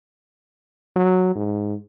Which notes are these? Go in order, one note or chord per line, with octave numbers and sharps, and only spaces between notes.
F#3
G#2